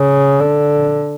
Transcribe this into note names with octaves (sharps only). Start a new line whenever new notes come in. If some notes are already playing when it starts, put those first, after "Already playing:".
Already playing: C#3
D3